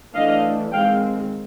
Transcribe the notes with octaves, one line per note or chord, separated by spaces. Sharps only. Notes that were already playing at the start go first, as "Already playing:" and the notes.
E3 A3 D4 D#5 F5
D#3 G#3 C4 F5 G5